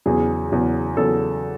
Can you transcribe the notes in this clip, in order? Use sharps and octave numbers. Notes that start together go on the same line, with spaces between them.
E2 C#3 F#3 G#4
E2 C#3 F#3
E2 C#3 F#3 A4